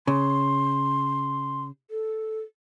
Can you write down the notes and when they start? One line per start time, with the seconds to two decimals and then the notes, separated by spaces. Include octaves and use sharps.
0.07 C#3 C6
1.91 A4